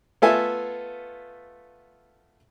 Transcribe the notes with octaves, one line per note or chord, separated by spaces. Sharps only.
A3 B3 F4 A4 E5 G#5